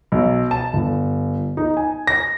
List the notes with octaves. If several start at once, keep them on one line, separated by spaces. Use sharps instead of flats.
B1
A5
G1
D#4
G#5
A#6